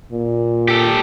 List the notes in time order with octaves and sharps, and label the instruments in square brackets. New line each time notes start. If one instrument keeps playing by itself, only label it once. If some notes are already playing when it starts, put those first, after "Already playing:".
[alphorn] A#2
[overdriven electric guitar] G4 A4